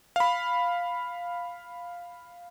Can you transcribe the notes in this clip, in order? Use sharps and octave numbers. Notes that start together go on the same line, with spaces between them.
F5 B5